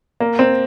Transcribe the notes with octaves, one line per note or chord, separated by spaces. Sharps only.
A#3
C4